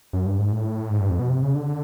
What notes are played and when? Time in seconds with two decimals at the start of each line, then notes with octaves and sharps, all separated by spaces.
0.13 F#2
0.26 G2
0.39 G#2
0.52 A2
0.90 G#2
1.00 G2
1.10 F2
1.19 B2
1.30 C3
1.42 C#3
1.55 D3